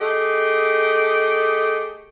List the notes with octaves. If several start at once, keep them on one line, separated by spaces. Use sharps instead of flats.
A3 G4 G#4 D#5